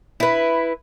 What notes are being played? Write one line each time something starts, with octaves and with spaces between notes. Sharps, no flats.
E4 B4